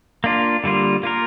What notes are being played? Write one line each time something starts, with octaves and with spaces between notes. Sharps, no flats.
A#3 D4 F4
D3 G3 A#3 F4
A#3 F4 A#4